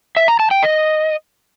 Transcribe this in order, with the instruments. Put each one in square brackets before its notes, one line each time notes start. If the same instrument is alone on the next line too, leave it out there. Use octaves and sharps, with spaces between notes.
[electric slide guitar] E5
A#5
A5
G5
D#5